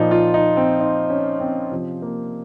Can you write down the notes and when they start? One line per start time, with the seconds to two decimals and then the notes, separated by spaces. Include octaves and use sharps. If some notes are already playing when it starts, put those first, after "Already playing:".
Already playing: A#2 F3 D#4
0.11 F4
0.34 D#4
0.57 C4
0.80 D#4
1.10 C#4
1.40 C4
1.71 C3 F3
2.02 A#3